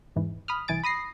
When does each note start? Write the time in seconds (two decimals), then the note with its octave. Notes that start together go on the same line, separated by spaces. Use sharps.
0.16 E2 G#2 E3
0.48 B5 D#6 F6
0.68 C2 E3 G#5 A6 D7
0.84 B5 D#6 A#6 C7